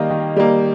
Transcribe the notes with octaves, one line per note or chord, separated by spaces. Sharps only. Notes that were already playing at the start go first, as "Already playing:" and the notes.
Already playing: D#3 G3 A#3 D#5 F5 G5
D#3
G3 A#3